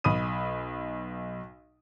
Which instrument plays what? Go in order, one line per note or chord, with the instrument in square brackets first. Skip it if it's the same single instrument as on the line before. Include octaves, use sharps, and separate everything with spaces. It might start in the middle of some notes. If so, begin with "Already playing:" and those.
[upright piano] B1 B5 D#6 D#7